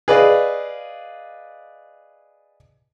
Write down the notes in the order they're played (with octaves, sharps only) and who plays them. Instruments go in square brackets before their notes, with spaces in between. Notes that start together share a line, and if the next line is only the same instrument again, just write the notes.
[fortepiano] G#4 B4 D5 D#5 F5